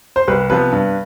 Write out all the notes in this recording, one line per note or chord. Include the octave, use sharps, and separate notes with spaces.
C5
C2 B4
C3 F3 B3 B4
G2